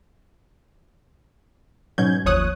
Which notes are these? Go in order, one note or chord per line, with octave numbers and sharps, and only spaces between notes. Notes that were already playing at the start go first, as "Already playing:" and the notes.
G#2 B2 F#3 C#4 G6 G#6
G1 D#2 F3 C#5 D#6 F#6